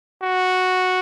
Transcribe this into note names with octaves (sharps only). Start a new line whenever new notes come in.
F#4